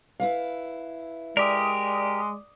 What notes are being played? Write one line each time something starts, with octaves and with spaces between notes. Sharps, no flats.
E4 B4 F5
G#3 G4 A#4 D5 D6 D#6